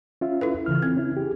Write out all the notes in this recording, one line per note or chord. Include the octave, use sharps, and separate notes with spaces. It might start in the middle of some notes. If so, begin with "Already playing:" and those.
C#4 F4 E5
E4 A4 B4
C#3 E3 F6
C4
C#4 E4
G4 G#4